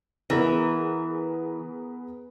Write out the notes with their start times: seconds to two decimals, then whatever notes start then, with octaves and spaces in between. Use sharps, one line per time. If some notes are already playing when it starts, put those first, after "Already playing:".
0.30 E3 B3 G#4 A#4